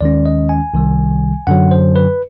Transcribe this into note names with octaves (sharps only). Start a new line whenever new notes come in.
D#2 D#3 G#3 C#4 D5
D#5
G#5
C2 C3 D#3 G3
F#2 D3 F#3 F#5
C5
B4